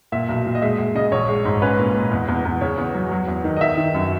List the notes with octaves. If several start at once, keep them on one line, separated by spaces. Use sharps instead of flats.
A#2 E5
B1
A#2
D#5
G#3 E5
G#3
C#3 D#5
A#1 C#5
G#3
G#2
C#4 B4
A#2
A#2
E2
E2
E2
C#3 C#5
E2
F#3
F#3
E2
D#3
D#5
D#3 E5
D#3
F#2